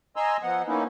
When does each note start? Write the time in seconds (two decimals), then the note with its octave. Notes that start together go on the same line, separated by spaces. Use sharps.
0.16 D#5 G#5 A#5 C6 E6
0.43 F3 B3 F#5
0.68 A#3 B3 C#4 D#4 E4